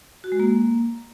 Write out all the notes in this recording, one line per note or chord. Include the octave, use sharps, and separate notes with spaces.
F#4
G#3
A#3